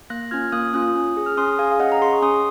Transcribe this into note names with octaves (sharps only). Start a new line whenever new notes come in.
A#3 F#6 A#6
C#4 F4 F6 G#6
A#3 D#6 F#6
C#4 F4 D#6 F#6
C#4
G#4
F6
C#4 C6 D#6
G#4 F5 G#5
F5
C#4 D#5 F#5
A#5
G#4 C6
C#6
C#4 C6 D#6